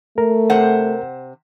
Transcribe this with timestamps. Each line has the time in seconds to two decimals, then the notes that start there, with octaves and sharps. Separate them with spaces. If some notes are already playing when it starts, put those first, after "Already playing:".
0.18 A3 A#4
0.50 C3 C5 F#5